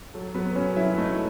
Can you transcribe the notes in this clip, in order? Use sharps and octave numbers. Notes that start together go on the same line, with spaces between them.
F#3 A4
F#3 B3 B4
F#3 C#4 C#5
F#3 E4 E5
A3 D#4 D#5